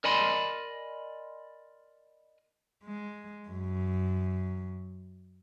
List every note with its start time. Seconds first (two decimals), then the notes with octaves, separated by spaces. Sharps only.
0.04 A#4 D5 D#5 G#5 B5 C6
2.84 G#3
3.49 F#2